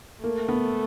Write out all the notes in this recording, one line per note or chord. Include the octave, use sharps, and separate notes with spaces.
A3 A#3
B3